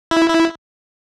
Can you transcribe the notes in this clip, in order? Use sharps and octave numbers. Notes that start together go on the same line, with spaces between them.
E4
E4